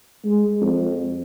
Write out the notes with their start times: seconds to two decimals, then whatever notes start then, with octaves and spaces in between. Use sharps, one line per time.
0.24 G#3
0.61 F2